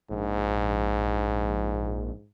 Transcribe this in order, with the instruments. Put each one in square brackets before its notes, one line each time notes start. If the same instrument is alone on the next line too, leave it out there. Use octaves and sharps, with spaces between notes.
[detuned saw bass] A#1 [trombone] G#2